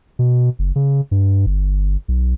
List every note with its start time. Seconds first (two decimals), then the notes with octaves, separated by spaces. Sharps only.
0.19 B2
0.59 F#1
0.76 C#3
1.11 G2
1.46 G1
2.08 B1